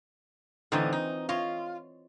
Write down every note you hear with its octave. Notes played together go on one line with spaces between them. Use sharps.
A2 D3 E3 C4 D#4 F4
D#4
F4 C#5 D#5 F5